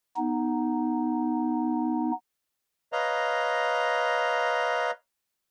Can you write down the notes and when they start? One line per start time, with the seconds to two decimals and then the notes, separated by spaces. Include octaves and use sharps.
0.16 B3 D#4
2.92 B4 C#5 D#5 F5 A#5